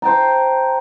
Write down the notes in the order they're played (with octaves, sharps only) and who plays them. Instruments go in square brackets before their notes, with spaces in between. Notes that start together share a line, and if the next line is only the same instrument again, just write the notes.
[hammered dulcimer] C5 G5 A5 A#5